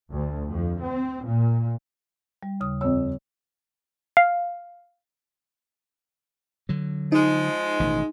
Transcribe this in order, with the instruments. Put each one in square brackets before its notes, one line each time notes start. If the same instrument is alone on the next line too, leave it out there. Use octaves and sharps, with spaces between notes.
[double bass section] D2
F2
C4
A#2
[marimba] G3
D#2 C#3 D#6
[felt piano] F2 E6 [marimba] C#5
[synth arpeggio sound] F5
[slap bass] D3 F#3
[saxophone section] F3 G#3 [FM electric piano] D#4
[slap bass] A1 B2 D#3